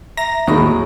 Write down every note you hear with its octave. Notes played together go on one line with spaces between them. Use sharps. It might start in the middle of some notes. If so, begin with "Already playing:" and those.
E5 A#5 A#6
D#2 A2 F#3 G#3 B5 C#6 D#6